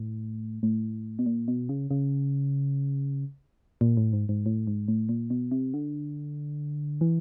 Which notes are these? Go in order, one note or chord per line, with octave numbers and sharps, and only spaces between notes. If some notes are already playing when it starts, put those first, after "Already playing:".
Already playing: A2
A2
B2
A#2
B2
C#3
C#3
A#2
A2
G#2
G#2
A2
G#2
A2
A#2
B2
C3
D3
E3